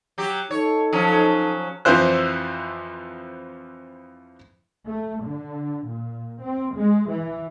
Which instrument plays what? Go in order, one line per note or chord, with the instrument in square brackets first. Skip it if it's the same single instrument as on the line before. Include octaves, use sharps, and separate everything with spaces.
[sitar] F#3 G4
[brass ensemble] D#4 A4 [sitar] C#5
[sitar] F3 F#3 C#4
[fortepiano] F2 E3 F3 E4 C5 F#6
[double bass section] A3
D3
A#2
C4
G#3
E3